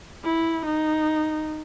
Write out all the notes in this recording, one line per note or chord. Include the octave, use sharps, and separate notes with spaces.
E4
D#4